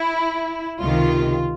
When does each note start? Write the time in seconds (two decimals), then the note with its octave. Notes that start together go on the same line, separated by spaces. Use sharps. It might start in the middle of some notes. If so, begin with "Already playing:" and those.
Already playing: E4
0.79 C#2 C3 D#3 F4